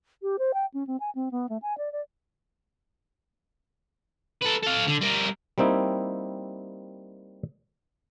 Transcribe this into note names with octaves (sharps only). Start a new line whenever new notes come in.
G4
C5
G5
C#4
C4
G#5
C4
B3
A3
G#5
D5
D5
A4 B4
A4 F5
D3
G3 A#4
G3 A#3 C4 D#4 E4